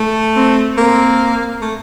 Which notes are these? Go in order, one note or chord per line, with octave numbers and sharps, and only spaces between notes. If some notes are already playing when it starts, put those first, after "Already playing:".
Already playing: A3
C4
A#3 C4
A3